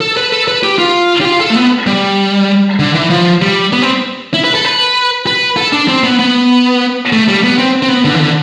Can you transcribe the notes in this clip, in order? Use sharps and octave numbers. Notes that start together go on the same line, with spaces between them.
A4
B4
A4
B4
G4
F4
G4
F4
A4
A3
B3
G3
D3
E3
F3
G3
B3
C4
E4
B4
A4
B4
B4
A4
D4
C4
B3
B3
A3
G3
B3
C4
C4
B3
D3
E3
D3